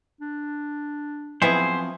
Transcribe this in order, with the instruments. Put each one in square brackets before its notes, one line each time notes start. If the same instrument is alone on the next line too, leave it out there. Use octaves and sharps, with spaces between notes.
[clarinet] D4
[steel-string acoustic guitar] F3 F#3 C4 [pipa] B3 E4 G#4 [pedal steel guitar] C5